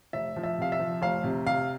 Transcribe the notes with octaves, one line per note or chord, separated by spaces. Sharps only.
F1 E5
F3
E5
C3 F5
E5
F3
F1 F5
C3
C3 F5